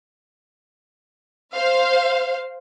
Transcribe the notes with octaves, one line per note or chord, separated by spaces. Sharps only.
C5 F5